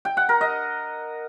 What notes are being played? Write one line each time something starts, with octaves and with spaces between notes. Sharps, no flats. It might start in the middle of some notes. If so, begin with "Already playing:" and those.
G5
F#5
A#4
D#5